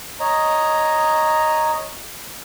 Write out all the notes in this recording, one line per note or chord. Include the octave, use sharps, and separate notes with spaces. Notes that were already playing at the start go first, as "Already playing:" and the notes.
C#5 D#5 A#5